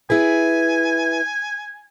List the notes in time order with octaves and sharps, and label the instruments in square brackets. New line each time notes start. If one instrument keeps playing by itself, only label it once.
[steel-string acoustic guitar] E4 G#4 B4 [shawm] G#5